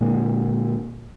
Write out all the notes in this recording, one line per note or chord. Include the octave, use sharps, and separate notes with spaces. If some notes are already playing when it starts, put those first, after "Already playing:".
A#2 D3 G#3 A#3